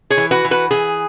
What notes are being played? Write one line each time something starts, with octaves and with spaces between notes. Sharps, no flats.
G#4 C#5
E3
F#4 B4
E3
F#4 B4
E3 G#4